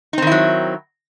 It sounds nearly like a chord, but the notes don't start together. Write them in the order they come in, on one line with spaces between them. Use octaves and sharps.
D#4 C4 D#3 E4 F#3